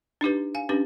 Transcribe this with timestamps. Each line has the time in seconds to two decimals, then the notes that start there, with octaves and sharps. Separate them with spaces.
0.21 D4 D#4 G4 B4
0.55 F5 G#5
0.69 C#4 D4 G4 B4